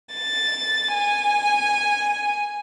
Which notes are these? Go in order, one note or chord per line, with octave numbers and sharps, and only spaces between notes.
A6
G#5